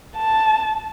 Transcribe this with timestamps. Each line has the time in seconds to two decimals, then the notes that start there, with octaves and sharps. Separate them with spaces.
0.17 A5